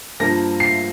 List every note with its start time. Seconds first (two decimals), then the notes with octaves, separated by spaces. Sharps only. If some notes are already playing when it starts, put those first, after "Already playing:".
0.20 G2 F3 A#3 A#6
0.60 C7